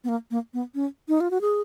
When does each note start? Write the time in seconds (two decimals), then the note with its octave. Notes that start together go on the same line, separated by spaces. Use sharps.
0.04 B3
0.09 A#3
0.31 A#3
0.54 B3
0.75 C#4
1.08 D#4
1.20 F4
1.31 F#4
1.41 G#4